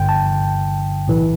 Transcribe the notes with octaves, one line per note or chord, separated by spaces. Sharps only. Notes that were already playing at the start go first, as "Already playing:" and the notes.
Already playing: G1 G2 D3 G5
A5
B1 A2 E3